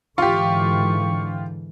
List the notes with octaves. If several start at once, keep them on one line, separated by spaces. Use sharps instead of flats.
G#2 D3 E3 F4 G4 C#6